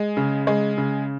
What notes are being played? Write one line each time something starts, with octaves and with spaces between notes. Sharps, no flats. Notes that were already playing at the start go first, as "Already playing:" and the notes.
Already playing: G#3
C#3
G#3
C#3